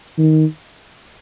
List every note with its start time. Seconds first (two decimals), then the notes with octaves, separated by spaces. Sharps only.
0.18 D#3